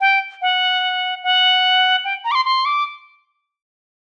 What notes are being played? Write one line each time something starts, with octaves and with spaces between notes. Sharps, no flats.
G5
F#5
F#5
G5
A#5
D6
C6
C6
D6